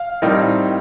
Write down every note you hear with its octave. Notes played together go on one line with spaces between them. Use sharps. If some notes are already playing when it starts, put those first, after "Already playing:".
Already playing: F5
A2 G3 C4 D#4 A#4